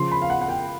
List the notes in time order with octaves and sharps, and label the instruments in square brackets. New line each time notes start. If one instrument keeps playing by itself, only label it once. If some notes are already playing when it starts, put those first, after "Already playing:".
Already playing: [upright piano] C#3 F3 C6
B5
F5
F#5
F#5
G5